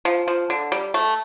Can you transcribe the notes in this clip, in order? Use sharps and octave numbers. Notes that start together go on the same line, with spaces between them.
F3
F3
D3
G3
A3